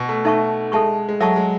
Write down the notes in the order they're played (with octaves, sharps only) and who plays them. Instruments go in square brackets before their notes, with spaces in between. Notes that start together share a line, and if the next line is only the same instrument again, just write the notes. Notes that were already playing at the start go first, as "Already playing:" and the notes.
Already playing: [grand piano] B2
A3
[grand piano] A3 [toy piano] D#4 A4 E5 A5 C#6
[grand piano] G#3 [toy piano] A4 E5 A5 C#6
[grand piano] G#3
[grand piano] F#3 [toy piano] A4 E5 A5 C#6
[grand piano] G#3